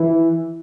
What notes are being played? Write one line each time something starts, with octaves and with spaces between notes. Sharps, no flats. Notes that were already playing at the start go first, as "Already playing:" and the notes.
Already playing: E3